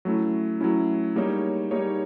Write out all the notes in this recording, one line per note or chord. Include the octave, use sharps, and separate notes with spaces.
F#3 A3 C#4 E4
F#3 A3 C#4 E4
G3 A#3 D#4 G#4 C#5
G3 A#3 D#4 G#4 C#5